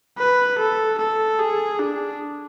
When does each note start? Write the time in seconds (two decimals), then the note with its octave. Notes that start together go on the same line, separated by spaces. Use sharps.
0.18 B4
0.58 A4
0.98 A4
1.39 G#4
1.79 D4